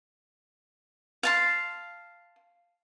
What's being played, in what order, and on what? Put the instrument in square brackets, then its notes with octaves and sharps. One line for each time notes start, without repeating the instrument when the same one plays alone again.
[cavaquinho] F5 A5 C6